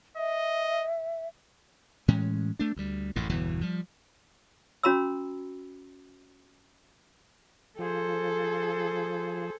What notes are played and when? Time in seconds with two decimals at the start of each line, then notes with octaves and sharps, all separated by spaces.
0.17 D#5 E5
2.08 A2 E3 G#3 C#4
2.59 A3 D4
2.76 D2 G3
3.16 A1 F#2 A2
3.29 G1 E2 B2 E3
3.61 F3 G3
4.83 C#4 F#4 A#5 B5 E6
7.79 F3 G#4 A4 C5